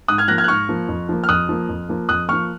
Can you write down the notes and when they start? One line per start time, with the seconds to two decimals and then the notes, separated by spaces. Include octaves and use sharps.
0.08 G#2 D#6 F#6
0.18 F6 G#6
0.28 F3 A#3 F#6 A#6
0.38 F6 G#6
0.44 F#6
0.48 G#2 C#6 F6
0.69 F3 A#3
0.89 F2
1.09 F3 A#3
1.24 F6
1.29 F2 D#6 F#6
1.49 F3 A#3
1.69 F2
1.89 F3 A#3
2.09 F2 D#6 F#6
2.29 F3 A#3 C#6 F6